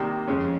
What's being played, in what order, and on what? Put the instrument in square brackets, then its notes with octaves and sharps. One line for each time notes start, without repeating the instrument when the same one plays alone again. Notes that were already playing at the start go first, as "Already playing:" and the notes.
Already playing: [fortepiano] C3 D#3 G3 A#3
[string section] F2 [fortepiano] C#3 G#3 C#4